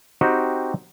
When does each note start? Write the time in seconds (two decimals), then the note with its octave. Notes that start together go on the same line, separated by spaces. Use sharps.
0.21 C4 D#4 F#4 G4